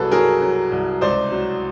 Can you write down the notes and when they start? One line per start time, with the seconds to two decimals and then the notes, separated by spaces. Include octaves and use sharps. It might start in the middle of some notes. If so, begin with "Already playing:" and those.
Already playing: C2 B2 F#3 G#4 A4 B4
0.12 F#3 G#4 A#4
0.42 F#3
0.72 C2
1.01 C#2 C5 D5
1.31 F#3